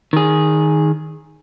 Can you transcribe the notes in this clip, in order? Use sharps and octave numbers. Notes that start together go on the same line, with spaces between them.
D#3 G#4